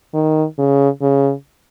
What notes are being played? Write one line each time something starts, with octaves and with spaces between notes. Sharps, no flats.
D#3
C#3
C#3